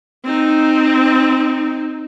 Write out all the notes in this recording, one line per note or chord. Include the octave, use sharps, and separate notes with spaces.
C4 D#4